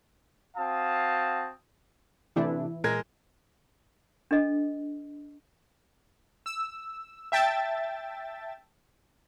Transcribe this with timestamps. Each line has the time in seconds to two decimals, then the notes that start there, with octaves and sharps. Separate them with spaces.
0.57 C4 F#4 F5 A5 D#6
2.36 C3 E3 A3 D4 E4
2.84 A#2 G#3 A#4 G#6
4.31 D4 A4 D#5
6.46 E6
7.32 E5 G5 A5 A6